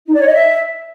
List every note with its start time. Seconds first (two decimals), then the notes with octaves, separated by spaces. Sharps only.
0.07 D#4
0.13 D5
0.20 C#5
0.26 D#5
0.33 E5